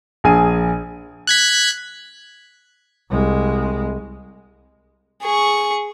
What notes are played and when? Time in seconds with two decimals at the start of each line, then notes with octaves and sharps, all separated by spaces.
0.24 A#1 G#4 G#5 D#7
1.27 F#6 G#6 B6
3.10 C2 G#3
5.22 G#4 C#6